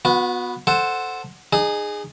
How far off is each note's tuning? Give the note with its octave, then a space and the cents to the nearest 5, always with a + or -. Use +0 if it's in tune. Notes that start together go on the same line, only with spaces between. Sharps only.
B3 +0 F#4 -35
A4 +0 C5 +0 F#5 +0
D#4 -35 G#4 +0